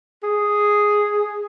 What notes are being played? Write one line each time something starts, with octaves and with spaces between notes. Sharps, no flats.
G#4